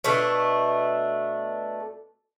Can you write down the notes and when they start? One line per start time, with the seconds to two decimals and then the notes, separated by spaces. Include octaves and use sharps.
0.04 B2 A3 D4